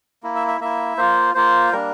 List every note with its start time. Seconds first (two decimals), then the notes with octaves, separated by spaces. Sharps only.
0.23 A#3 E4
0.35 E5
0.48 E5
0.61 A#3 E4 E5
0.98 A#3 F4 C5
1.35 A#3 F4 C5
1.72 G3 A#3 D4 A#4